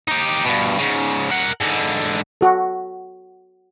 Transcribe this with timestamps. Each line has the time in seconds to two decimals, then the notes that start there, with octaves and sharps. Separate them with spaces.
0.08 D#4 G4
0.44 G2 B2
0.78 G#2 C#3
1.31 A#4 F#5
1.61 G#2 D3
2.41 F#4 A4